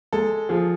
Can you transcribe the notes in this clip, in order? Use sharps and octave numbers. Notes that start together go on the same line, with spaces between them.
G#3 A4
F3 G#4